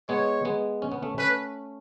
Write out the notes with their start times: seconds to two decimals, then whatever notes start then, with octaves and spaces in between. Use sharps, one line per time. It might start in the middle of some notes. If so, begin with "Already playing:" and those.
0.09 G#3 B3 C#5
0.45 G#3 B3
0.82 C#4
0.92 B3
1.02 A3 C#4
1.18 A3 C#4 B4